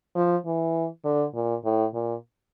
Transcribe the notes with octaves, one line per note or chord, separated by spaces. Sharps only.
F3
E3
D3
A#2
A2
A#2